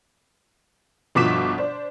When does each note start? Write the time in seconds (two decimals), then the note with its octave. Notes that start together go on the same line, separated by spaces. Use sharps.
1.15 G1 B2 F3 D6 B6 E7
1.58 D4 C5